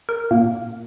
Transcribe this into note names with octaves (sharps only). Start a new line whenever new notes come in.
A#4
A#2 A#3